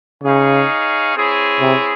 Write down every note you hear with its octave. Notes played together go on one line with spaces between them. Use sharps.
C#3 D#4 G#4 C#5 F5
C4 E4 G#4 C#5
C3